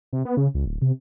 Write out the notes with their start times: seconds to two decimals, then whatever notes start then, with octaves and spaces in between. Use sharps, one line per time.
0.13 C3
0.25 B3
0.37 C#3
0.55 C#2
0.66 D1
0.82 C3